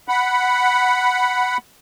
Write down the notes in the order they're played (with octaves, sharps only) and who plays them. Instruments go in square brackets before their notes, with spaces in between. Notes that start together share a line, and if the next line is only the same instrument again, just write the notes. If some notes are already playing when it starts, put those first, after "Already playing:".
[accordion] F#5 B5